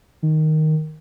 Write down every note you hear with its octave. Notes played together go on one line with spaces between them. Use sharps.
D#3